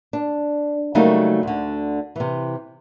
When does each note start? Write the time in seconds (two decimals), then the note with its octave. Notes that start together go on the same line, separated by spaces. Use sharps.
0.13 D4
0.95 C#3 F#3 G3 A3 A#3 D#4
1.43 D2 D3
2.16 C3 E3